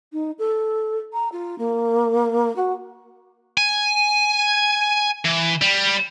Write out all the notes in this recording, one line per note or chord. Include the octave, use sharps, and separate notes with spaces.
D#4
A4
A#5
F4
A#3
F#4
G#5
E3
G3